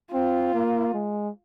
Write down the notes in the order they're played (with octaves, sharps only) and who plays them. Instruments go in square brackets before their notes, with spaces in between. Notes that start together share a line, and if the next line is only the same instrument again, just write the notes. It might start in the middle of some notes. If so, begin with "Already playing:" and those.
[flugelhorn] C4 [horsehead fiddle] F4
[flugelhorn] A#3
G#3